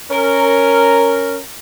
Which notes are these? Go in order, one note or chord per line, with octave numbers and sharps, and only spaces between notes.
C#4 A#4